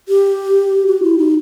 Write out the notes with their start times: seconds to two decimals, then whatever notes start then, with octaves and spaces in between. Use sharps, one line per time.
0.09 G4
0.87 F#4
1.03 E4
1.18 D#4